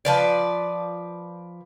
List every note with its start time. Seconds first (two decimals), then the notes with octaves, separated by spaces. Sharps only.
0.05 F3 B4 D5